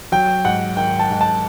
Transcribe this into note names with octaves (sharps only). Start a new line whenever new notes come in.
F#3 G5
G#2 F#5
D#3 G5
A5
G#2
A5